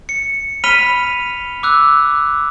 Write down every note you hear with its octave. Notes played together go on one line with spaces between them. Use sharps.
C#7
B5 F6 B6 D#7 F7 G7
D6 E6 F#6